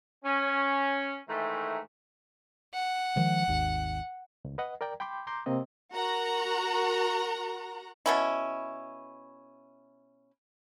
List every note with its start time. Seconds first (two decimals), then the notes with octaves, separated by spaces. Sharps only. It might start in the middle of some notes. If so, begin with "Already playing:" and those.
0.24 C#4
1.28 G#2 D#3 E3 A3
2.74 F#5
3.16 D#3 F3 G#3
3.48 G#1 D#2
4.45 C#2
4.58 B4 D#5 F#5
4.81 A#4 D5 G5 A#5
5.00 G5 B5 C6 D6 G6
5.27 A#5 C6 D6 G6
5.46 C3 A#3 C4 D#5
5.93 F#4 A#4 F#5 A#5
8.06 B2 C#4 E4